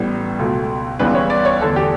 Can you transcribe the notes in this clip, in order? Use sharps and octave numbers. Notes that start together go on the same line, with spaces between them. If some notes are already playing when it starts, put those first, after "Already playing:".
Already playing: A1 A2 G3 B3
C#2 B2 A3
C#2 C#3 E3 G3 B3 B4
C#5
D5
C#5
E2 D3 A3 A4
G4